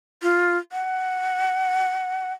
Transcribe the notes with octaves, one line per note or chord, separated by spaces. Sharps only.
F4
F#5